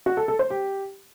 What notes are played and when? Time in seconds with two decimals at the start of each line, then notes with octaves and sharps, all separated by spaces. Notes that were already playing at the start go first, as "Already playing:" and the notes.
0.06 F#4
0.17 A4
0.28 A4
0.39 C5
0.50 G4